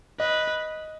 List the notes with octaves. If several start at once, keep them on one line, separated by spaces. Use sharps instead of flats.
B4 D#5